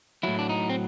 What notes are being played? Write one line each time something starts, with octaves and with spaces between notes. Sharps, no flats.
A2 F#3 E4
D4
D#4
C4